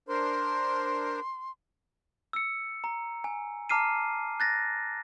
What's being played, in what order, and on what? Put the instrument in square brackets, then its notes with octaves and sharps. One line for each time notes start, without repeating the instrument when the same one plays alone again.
[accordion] D4 A#4 C5 [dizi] C6
[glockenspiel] E6 C#7
A#5
G#5
A5 A#5 D6 F6 C7 D#7
F#6 A6 A#6